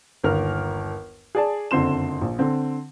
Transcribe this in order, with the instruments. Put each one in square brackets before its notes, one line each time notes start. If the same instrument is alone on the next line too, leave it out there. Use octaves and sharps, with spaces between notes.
[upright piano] G1 D#2 A#4 F6
G#4 D5 A5
F#1 F2 D3 C4 C6 E7
A#1
D3 C4